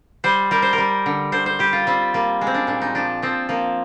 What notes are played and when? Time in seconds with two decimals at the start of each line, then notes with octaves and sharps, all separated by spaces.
0.24 G3 C5
0.51 G3 A#4
0.62 C5
0.73 A#4
0.78 G3
1.06 D3
1.32 D3 C5
1.46 C5
1.59 G3 G4
1.73 F4
1.87 G3 C4
2.14 G3 A#3
2.41 G#3
2.47 C4
2.54 D4
2.67 A#2 D4
2.82 D#4
2.95 F3 D4
3.22 F3 C4
3.49 F3 A#3